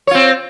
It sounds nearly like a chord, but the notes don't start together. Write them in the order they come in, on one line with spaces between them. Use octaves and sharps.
C#5 F4 C4